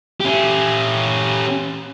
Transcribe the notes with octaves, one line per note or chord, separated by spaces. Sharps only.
C#4 G4